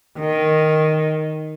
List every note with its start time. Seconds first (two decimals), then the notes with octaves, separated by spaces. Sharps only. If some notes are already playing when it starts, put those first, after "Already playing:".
0.20 D#3